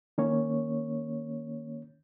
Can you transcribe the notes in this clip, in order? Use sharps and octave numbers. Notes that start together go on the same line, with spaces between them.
D#3 A#3 C#4 C#5